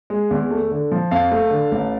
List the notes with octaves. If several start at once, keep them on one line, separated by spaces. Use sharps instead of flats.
G#3
E2
A3
D3
F3
F2 F5 A5
A3
D3
A1